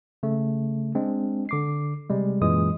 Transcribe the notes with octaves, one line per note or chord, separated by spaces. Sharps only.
C#3 A3
G#3 C4 D4
D3 D6 C7
C3 G3 G#3
F#2 A#2 E3 G#3 D#6